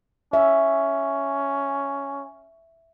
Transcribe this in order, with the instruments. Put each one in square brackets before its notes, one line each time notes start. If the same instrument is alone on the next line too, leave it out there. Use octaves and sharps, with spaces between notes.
[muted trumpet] C#4 [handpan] E5